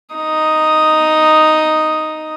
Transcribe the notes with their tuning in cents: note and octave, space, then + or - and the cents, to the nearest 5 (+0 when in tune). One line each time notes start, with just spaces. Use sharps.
D#4 +0 D#6 +0